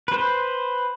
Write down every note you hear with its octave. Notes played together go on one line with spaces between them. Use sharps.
B4 C5